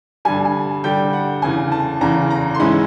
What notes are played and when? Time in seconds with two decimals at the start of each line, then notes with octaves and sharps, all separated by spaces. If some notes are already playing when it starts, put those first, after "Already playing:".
0.25 G2 D3 G3 G#5
0.45 G#5
0.84 G2 D3 G3 G5
1.13 F#5
1.42 E2 C#3 E3 G#5
1.72 A5
2.01 E2 C#3 E3 A#5
2.30 A#5
2.54 C6
2.59 G#2 E3 G#3 C#4 E4 B5